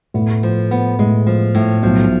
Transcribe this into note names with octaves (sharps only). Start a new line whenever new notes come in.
A2 B3
F3
B3
A2 G#3
F3
A2
B1 B2 F3